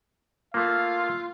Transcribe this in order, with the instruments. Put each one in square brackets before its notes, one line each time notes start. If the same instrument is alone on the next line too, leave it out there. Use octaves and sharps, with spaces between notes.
[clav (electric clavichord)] A3 A#3 [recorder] F4 [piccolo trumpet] F5